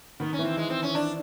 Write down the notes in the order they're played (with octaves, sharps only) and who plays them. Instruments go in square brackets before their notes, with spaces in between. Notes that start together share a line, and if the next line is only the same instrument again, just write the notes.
[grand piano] D#3 [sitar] B3
[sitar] C#4
[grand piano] E3
[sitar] C4
G#3
C4
C#4
D4